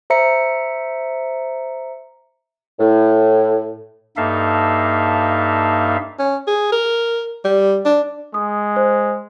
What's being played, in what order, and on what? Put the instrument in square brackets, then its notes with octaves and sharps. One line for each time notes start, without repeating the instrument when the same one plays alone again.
[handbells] C5 E5 A#5 C#7
[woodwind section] A2
[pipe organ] G2 A#3 D#4 A4 E5 F5
[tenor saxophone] C#4
G#4
A#4
G3
D4
[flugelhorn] G#3 [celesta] D#6
[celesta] C5